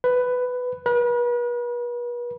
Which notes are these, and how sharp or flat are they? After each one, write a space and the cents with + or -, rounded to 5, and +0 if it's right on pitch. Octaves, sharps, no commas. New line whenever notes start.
B4 +10
B4 -40